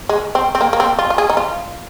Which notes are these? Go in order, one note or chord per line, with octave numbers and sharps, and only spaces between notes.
G#3
C4
C4
A#3
A#3
C4
F4
F4
G#4
D#4
F4